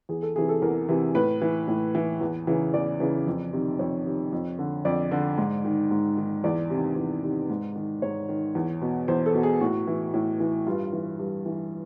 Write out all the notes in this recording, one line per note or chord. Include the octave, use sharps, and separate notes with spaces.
E2 G#4
A4
C3 E3 G#4
A4
E2 A#4
C3 E3
A2 B4
E3
A2
E3
E2
C#3 E3
E2 D5
C#3 E3
F2
C3 D#3
F2 C#5
C3 D#3
F2
D3
F2 D5
D3
G#2
D#3
G#2
D#3
E2 D5
C3 D#3
E2
C3 D#3
G#2
D#3
G#2 C#5
D#3
E2
B2
E2 C5
A4
B2
G#4
A2 F#4
E3
A2
E3
G2 F4
E3
G2
E3